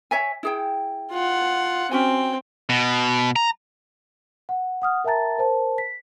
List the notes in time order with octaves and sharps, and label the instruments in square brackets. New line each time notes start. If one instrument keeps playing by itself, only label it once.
[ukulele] C#5 E5 G#5
E4 G#4 G5
[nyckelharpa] F4 F#5
[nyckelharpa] C4 G5 [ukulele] C#4 F#4 G#5
[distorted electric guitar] B2
A#5
[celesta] F#5
F#5 D#6 F6
A#4 E5 G5 A5 A#5 A6
A#4 C5 A5
B6